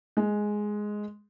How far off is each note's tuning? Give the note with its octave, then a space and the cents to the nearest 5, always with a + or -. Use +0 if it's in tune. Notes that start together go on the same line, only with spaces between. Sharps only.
G#3 +5